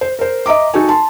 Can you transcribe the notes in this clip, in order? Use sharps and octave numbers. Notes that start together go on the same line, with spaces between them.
C5
A#4 C5
D#5 E5 A#5 D6
D#4 F#4 A4 G#5
A5 C6